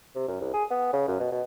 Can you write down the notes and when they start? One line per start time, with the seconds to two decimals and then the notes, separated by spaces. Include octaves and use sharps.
0.16 C3
0.28 F#2
0.41 C2
0.54 G#4
0.71 B3
0.93 C#3
1.08 F#2
1.20 B2
1.32 B2